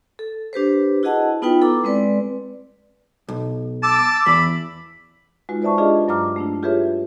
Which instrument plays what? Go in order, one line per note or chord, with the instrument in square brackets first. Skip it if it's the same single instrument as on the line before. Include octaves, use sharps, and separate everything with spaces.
[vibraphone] A4
D4 G4 B4 C5
E4 F#4 G#4 D#5 F#5 A5
B3 D#4 F4 B4 G5
E4 A4 A#5 D6
G#3 C4 B4 D5
[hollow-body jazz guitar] B1
[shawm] A5 [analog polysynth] D6 E6
[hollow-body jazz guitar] E2 [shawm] B5
[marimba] G#3 D#4 F4 F#4 B4
B4 C5 D5 E5 A5 C#6
D4 F4 G4 G#4 D5 D#5
G2 F#3 A#5 D6 F6
A3 D4 E4
F4 G4 G#4 B4 C#5 E5